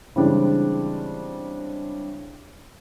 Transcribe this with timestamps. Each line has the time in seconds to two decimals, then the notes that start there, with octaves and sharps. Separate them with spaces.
0.16 C#3 E3 G3 G#3 C4 D4